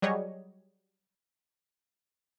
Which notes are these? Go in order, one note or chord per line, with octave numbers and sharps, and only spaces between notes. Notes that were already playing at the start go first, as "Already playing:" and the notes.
F#3 G3 G#4 C#5 D#5